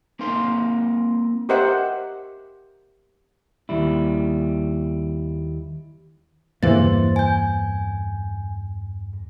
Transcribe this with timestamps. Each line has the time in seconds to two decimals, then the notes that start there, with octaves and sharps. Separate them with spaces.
0.19 A#3 C4 D#4 A#4 F5 C6
1.49 G4 A#4 C5 D#5 E5 F#5
3.69 D#2 G3 E4
6.63 E2 G2 C#3 E3 A#3 C5 A6
7.16 G#5 G6